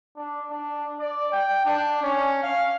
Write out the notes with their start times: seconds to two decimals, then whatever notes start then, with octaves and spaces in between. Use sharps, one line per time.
0.16 D4
0.50 D4
0.99 D5
1.32 G5
1.65 D4
2.02 C#4
2.43 F5